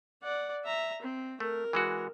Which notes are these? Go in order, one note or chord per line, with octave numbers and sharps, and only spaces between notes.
D5 F#5
E5 A#5
C4
A3 A#4
E3 G#3 F#4